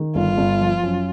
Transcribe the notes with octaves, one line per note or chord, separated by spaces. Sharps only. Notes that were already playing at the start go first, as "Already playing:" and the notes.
Already playing: D#3
G1 F4
G1
F3
F#2